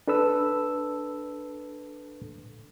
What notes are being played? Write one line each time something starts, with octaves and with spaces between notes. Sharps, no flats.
D4 A4 B4 E6